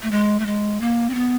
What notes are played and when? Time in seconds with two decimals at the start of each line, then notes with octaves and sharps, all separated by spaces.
0.03 A3
0.11 G#3
0.40 A3
0.46 G#3
0.81 A#3
1.10 C4
1.14 B3